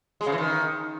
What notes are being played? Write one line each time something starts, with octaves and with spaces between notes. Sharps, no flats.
G#3
C#3
E3
D#3